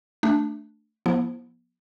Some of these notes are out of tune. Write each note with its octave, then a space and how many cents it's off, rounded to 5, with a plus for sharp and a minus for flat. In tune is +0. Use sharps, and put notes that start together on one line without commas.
A3 +5 D4 +0
F3 +0 B3 -45 E4 +0